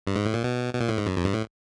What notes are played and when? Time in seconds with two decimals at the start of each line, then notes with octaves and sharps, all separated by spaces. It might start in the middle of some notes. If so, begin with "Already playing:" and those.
0.07 G2
0.15 G#2
0.25 A2
0.34 A#2
0.44 B2
0.74 B2
0.80 A#2
0.89 A2
0.98 G#2
1.06 F#2
1.17 F2
1.25 G2
1.34 A2